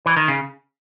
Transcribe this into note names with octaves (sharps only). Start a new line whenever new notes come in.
E3
D#3
C#3